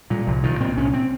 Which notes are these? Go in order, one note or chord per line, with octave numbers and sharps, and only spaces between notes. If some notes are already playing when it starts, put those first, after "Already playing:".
A#2 G3
C2 F3
A#2 D#3
A#2 C4
C2 C#4
C4